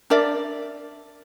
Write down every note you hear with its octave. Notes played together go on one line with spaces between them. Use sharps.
D4 A#4 D5 E5